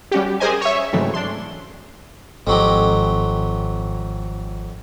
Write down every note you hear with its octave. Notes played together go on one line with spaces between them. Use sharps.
G3 C#4 F#4 G4
G4 G#4 A#4 C5 D#5 G#5
C#5 E5
G#2 C#3 E3 F#3 A3 C4
D4 C6
G#1 F2 F#3 G4